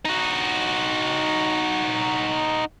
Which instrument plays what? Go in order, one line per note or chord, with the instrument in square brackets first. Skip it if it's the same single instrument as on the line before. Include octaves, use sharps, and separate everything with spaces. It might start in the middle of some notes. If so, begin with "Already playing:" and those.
[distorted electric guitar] D#4 F#4